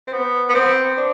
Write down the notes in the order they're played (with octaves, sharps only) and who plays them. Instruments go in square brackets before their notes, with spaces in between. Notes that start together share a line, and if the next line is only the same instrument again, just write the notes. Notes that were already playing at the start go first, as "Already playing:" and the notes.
[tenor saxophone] C4
B3
B3
C4
D4